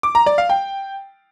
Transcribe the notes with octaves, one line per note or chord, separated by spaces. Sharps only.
D6
A#5
D5
F5
G5